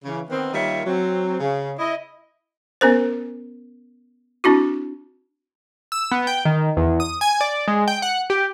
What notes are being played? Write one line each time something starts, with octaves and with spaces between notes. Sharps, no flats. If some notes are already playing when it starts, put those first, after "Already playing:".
C#3 E3
D#3 B3 C4
D#3 G3 A#3 F4 C#5 E5
F#3 C4
C#3
E4 D#5
B3 C#4 A#4 C5
C4 D4 E4 F#4
E6
B3
G5
D#3
E2
D#6
G#5
D5
G#3
G5
F#5
G4